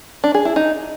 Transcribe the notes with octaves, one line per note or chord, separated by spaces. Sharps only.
D4
G#4
E4
D#4